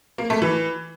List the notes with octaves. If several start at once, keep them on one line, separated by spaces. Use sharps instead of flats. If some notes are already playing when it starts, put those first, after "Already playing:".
A#3
A3
E3